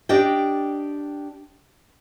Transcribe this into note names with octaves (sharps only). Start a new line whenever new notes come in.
D4 G4 D5 D#5 G5